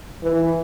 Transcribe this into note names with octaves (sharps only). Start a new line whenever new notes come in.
E3